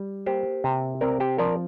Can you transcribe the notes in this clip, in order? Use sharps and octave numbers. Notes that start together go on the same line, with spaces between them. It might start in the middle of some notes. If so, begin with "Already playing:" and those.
Already playing: G3
A#3 G4 C5
C3
C4 A#4 D5
G4 C5
F3 A#4 D5